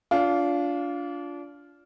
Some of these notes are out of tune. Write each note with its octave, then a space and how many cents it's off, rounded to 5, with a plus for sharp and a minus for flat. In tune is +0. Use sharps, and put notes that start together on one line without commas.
D4 -30 F4 +0